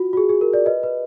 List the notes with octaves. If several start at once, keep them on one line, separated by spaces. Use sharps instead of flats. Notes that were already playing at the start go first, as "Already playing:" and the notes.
Already playing: F4 F#4
F#4
G#4
G#4
A#4
A#4 D5
B4 D#5
B4